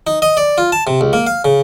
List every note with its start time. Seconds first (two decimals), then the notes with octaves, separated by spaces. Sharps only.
0.07 D#4
0.22 D#5
0.37 D5
0.58 F4
0.72 A5
0.87 C3
1.01 C#2
1.13 A#3
1.27 F5
1.45 C#3